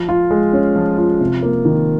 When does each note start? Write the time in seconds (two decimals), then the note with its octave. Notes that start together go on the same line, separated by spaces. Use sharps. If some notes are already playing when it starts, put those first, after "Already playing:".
Already playing: F3
0.09 F4
0.31 G#3
0.53 C#4
0.76 F3
0.98 F4
1.20 C3
1.43 A#3
1.65 D#3